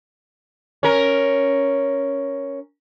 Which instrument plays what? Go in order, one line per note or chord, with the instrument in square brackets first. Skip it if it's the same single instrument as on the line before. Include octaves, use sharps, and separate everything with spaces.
[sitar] C#4 A#4